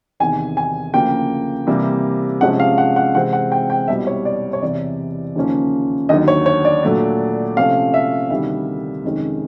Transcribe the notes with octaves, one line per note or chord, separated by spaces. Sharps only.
E2 C3 D#3 G#5
G#5
D2 C#3 F3 A#3 G5
C3 E3 G3 A#3
C3 F3 G#3 C#4 F#5
F5
F#5
F#5
C3 E3 G#3 C4 F#5
F#5
G5
G5
C2 B2 G3 C4 E5
C#5
D5
C#5
E2 C3 E3 D5
D#2 C#3 F3 A#3 C#4
D#2 D3 F#3 D#5
C#5
C#5
D5
A#2 F#3 A3 D4
C3 F3 A3 C#4 F5
E5
D2 C3 D#3 G3 E5
F2 C3 D#3 G#3 C#4